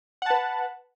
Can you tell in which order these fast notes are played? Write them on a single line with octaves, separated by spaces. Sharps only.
F#5 A5 B4